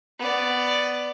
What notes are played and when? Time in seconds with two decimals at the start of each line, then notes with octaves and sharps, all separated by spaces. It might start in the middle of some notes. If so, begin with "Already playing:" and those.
0.19 B3 D5